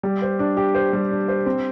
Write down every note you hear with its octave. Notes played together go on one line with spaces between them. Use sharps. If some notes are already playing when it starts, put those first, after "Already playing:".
G3
C5
D4
G4
C5
G3
D4
C5
C4